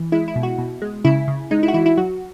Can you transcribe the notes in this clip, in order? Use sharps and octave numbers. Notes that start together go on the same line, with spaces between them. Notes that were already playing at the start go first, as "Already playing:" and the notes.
Already playing: E3
G#3 E4
E4
B2
F#4
B2
G#3
C#3 E4
C#3
G#3 D#4
E4
F#4
E3 E4
E4
F#3 F#4